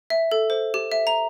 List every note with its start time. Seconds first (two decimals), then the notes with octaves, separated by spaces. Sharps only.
0.10 E5
0.32 A4
0.50 C5
0.74 G4
0.92 E5
1.07 A#5